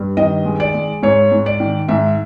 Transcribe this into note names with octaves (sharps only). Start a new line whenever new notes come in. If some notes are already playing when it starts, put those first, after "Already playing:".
Already playing: G2
D#3 D#5
G#3
D5
G#3
G#2 C#5
G#2
D5
D#3
G#2 E5